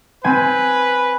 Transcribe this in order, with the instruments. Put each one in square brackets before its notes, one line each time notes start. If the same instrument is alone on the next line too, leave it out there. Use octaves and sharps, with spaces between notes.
[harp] C4 G#5 [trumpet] B4